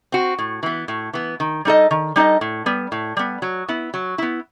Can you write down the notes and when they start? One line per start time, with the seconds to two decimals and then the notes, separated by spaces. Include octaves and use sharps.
0.12 C4 F#4
0.39 A2
0.63 E3 B3
0.88 A2
1.13 E3 B3
1.40 D#3
1.65 G3 D#4 A4 D#5
1.91 D#3
2.16 G3 D#4 A4 D#5
2.41 A2
2.66 G3 B3
2.92 A2
3.17 G3 B3
3.42 F#3
3.68 B3 E4
3.94 F#3
4.18 B3 E4